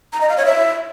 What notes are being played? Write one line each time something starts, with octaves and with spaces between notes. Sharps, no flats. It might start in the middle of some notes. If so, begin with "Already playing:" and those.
A#5
D#5
F5
C#5
E5